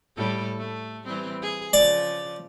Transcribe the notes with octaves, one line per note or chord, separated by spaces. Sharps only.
A2 G3 A4
A3
E3 G3 C4
G#4
C#3 F3 D5